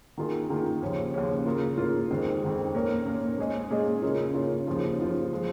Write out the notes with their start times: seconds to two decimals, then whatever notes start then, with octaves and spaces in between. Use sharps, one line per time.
0.18 D#3 A#3 F4 G#4
0.50 D#3 A#3 F4 G#4
0.81 D#2 C#3 F3 C#4
1.14 D#2 C#3 F3 C#4
1.46 C#3 A#3 F4
1.78 C#3 A#3 F4
2.10 F2 D#3 G#3
2.42 F2 D#3 G#3
2.74 A#2 A#3 C#4 A#4
3.06 A#2 A#3 C#4 A#4
3.38 A#2 G#3 C#4 G#4 D#5
3.71 A#2 G#3 C#4 G#4 D#5
4.02 C#3 A#3 C#4 F4
4.34 C#3 A#3 C#4 F4
4.67 D#2 C#3 F3 C#4 F4
4.99 D#2 C#3 F3 C#4 F4
5.33 F3 G#3